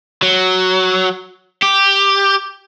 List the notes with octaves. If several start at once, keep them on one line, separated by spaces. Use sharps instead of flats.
F#3
G4